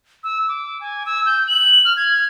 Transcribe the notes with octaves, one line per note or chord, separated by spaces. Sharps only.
E6
D6
G#5
E6
G6
F#7
F6
G#6